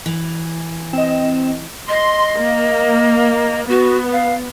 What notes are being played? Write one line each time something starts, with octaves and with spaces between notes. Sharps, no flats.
E3
C4 D#5 E7
D#5 C6
A#3
B3 F#4
F5